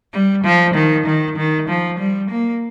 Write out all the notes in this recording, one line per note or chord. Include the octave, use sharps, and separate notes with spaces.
G3
F3
D#3
D#3
D#3
F3
G3
A#3